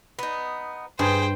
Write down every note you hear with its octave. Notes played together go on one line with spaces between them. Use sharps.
B3 D#4
G2 G#4 C5 G5